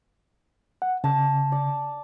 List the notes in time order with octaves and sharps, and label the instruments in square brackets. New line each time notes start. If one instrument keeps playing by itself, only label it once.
[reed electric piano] F#5
[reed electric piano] C#3 [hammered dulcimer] A5
[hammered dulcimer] D5